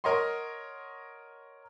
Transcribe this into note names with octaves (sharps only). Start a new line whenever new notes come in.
A#4 C#5 D#5 F#5 C6